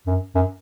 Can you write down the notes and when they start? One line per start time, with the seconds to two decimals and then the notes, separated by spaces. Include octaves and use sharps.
0.07 F#2
0.35 F#2